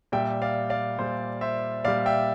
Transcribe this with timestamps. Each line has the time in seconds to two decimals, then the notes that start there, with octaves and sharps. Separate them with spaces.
0.12 A#2 G3 E5 G5
0.42 D5 F5
0.70 D5 F5
0.99 A#2 G3 C5
1.41 C5 E5
1.84 A#2 D5 F5
1.88 G3
2.06 E5 G5